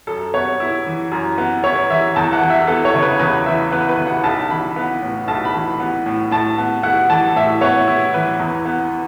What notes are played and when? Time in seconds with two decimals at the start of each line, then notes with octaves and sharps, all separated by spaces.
0.07 F#2 A4
0.34 B3 C#5
0.60 E4
0.86 E3
1.12 F#2
1.38 B3
1.64 E4 C#5
1.90 E3 E5
2.16 E2 A5
2.33 F#5
2.42 E3
2.50 E5
2.67 B3 A4
2.85 C#5
2.94 C#3
3.03 B4
3.20 E2 B4
3.46 E3 E5
3.71 B3 B4
3.89 B4
3.98 C#3
4.07 F#5
4.23 B1 A5
4.50 E3 B5
4.76 B3
5.02 A2
5.28 B1 A5
5.45 B5
5.54 E3
5.80 B3
6.06 A2
6.31 A2 A5
6.58 B3
6.83 E4 F#5
7.10 E3 A5
7.36 A2 E5
7.61 B3 C#5
7.88 E4
8.14 E3 B4
8.39 E2
8.65 B3